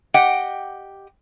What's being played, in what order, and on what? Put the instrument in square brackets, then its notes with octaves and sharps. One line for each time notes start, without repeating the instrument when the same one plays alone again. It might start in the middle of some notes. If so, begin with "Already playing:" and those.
[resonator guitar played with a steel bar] G4 D#5 F#5 G5